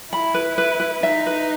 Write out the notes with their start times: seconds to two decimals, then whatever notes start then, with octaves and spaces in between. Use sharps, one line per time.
0.12 E4 B5
0.34 B4
0.58 B4
0.80 B4
1.03 D#4 E5
1.26 B4